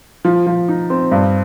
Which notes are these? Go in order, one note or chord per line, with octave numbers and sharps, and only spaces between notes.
F3
F3
D#4
C4
G2